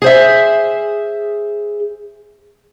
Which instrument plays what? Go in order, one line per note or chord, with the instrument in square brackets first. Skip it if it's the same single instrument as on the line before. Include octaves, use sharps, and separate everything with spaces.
[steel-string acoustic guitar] G#4 C5 E5